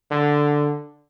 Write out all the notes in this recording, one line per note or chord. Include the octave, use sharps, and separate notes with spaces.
D3